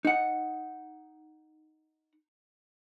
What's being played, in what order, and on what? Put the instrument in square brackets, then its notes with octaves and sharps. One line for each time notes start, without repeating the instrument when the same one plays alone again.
[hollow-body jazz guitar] D#4 F#5